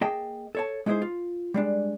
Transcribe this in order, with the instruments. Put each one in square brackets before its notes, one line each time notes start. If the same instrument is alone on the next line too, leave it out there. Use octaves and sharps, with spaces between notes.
[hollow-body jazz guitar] A#3 G#4 D#5 G5 A5
A4 C#5 A5
G#3 D#4 E4 G#4 C5
F4
G3 G#3 D4